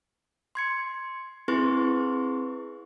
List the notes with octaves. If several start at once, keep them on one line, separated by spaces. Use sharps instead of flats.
C6 G#6 C#7
C4 E4 G#4 B4 C6 C#6